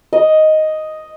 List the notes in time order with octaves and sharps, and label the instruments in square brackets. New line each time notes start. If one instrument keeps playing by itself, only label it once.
[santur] D#5